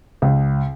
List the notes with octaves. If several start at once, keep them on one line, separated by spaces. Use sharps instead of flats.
C#2